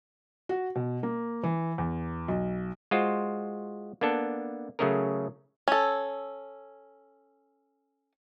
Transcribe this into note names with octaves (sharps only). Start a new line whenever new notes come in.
F#4
B2
A#3
E3
E2
B1
G#3 F4 F#4 C5
A#3 B3 D4 A4
C#3 F#3 A3 C#4 G#4 A#4
C#4 A4